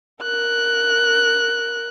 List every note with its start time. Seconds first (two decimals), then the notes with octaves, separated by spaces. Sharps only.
0.22 A#4 F#6